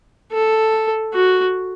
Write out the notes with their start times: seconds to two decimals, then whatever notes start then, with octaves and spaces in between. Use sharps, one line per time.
0.32 A4
1.14 F#4